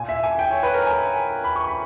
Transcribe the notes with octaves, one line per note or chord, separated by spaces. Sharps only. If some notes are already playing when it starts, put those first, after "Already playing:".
Already playing: A#2 G#5
E5
G#5
G5
C#5
B4
A#4
G#5
B5
C#6
B5